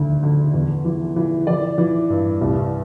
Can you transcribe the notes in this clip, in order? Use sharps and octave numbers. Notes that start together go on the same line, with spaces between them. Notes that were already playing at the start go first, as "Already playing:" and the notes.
Already playing: D2 D3
D3
E2
E3
E3
E3 D5
E3
G2
C2